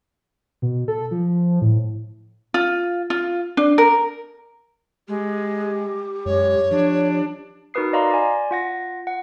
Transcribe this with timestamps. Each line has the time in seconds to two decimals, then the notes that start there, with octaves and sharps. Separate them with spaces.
0.62 B2
0.88 A4
1.11 F3
1.62 A2
2.54 F4
3.10 F4
3.57 D4
3.78 A#4
5.08 G#3 G4
6.26 F#2 G#3 C#5
6.71 F3 D4
7.74 D#4 F#4 A#4 B4 D#6 C7
7.93 D5 D#5 F5 A#5 C6 D6
8.11 D5 G#5
8.51 F4 F#5 A#6
9.07 F#5